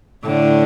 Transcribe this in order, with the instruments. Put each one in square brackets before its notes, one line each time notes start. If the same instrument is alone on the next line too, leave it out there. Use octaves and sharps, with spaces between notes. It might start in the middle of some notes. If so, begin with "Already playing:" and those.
[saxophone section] A2 [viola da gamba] D3